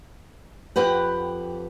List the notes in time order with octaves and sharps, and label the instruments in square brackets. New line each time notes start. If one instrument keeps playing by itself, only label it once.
[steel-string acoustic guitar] F2 G4 B4 F#5